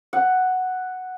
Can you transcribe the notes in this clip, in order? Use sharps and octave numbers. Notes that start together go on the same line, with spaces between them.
F#5